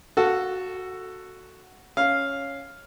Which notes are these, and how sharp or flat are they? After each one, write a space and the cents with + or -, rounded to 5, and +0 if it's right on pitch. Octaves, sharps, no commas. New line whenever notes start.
F#4 +0 A4 +10 F5 +25
C#4 +0 F5 +0